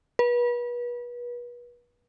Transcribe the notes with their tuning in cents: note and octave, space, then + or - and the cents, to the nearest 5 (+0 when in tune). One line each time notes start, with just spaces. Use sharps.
B4 -35